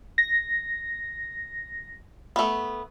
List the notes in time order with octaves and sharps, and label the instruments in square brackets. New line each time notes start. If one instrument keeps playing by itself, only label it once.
[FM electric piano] A#6
[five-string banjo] A3 B3